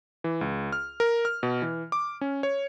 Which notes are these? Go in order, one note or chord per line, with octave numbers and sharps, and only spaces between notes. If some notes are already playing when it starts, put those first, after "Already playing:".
E3
C#2
F6
A#4
F6
B2
E3
D6
C#4
C#5